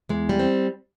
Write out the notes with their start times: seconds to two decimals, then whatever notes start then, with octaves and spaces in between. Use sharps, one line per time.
0.09 E2 G#3
0.29 G3
0.39 C4